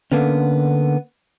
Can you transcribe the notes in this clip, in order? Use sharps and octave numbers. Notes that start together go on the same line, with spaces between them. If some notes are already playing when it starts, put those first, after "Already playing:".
D3 A#3 B3 C#4